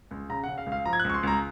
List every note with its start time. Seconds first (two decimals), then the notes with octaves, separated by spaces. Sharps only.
0.11 C#2
0.29 C#3 A#5
0.44 C#3 F#5
0.58 F5
0.66 C#2
0.72 F5
0.85 F3 A#5
0.93 G#6
1.00 F#6
1.04 C#2
1.10 C#6
1.14 C6
1.23 C#2 A#5